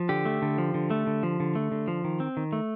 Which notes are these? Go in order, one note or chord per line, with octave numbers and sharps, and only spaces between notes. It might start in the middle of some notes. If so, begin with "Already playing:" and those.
Already playing: F3
D3 G4
A3
D3
F3
D3
A3
D3
F3
D3
A3
D3
F3
D#3
C4
D#3
A3